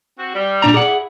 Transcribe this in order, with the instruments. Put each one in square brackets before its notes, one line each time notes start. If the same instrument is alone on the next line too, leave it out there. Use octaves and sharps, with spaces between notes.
[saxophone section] C4 F#4
G3
[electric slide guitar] A#2 D4 A#5
[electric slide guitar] G#4 F#5 [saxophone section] D5
[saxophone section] E4